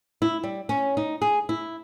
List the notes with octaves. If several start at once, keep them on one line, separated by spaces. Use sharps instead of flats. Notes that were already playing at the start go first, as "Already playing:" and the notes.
E4
G3
C#4
D#4
G#4
E4